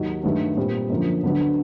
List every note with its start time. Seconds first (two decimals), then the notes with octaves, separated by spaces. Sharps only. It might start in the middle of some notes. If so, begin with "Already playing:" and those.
Already playing: D#2 D#3 F#3
0.23 G2 D#3 F#3 A3
0.57 A#2 G3 C4
0.90 F#2 D3 F3 A#3
1.23 D2 D3 F#3 B3 D4